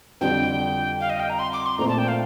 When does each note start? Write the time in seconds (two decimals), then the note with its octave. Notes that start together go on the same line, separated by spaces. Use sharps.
0.21 F2 D3 G3 D4 F4 G5
1.00 F5
1.10 D#5
1.20 G5
1.30 A#5
1.39 C6
1.53 D6
1.66 C6
1.79 A#1 A#2 A3 C4 A#5
1.88 A5
1.98 G5
2.08 F5